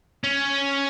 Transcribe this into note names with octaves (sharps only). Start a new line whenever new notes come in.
C#4